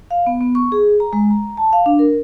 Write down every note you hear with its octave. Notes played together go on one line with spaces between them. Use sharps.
F5
B3
B3
C#6
G#4
A#5
G#3
A#5
A5
F5
D4
A#4